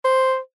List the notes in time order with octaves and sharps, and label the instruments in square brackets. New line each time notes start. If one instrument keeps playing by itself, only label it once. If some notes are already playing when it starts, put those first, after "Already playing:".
[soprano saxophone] C5